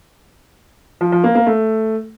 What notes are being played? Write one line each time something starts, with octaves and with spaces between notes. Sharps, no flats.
F3
F3
A#3
A#3
A3